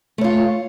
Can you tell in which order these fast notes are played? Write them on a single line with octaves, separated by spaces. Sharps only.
A3 C#5 F4